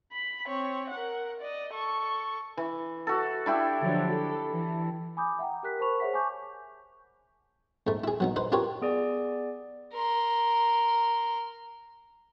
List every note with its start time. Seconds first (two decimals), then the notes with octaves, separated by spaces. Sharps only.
0.12 B5
0.47 C4 C#5
0.90 A#4 F#5
1.40 D5 D#5
1.73 A4 C#6
2.57 E3
3.07 F#4 A4
3.46 D4 E4 G4
3.81 D3 F3 F#3
4.11 A4
4.49 E3
5.17 G#5 B5 D6 D#6 G6
5.39 E5 F#5 G5 A#5
5.63 G4 A#4 F#6 B6
5.79 A#4 C5 A5 B5 C#6 F7
6.00 G#4 C5 C#5 E5 F#5 B6
6.13 G#5 A5 C#6 D6 G6
7.87 G#2 A3
8.04 E4 G#4
8.20 F#3 B3 D#4
8.36 D#4 B4 C5
8.52 F4 G4 A#4 B4 C#5
8.81 B3 G#4 D5
9.92 A#4 C6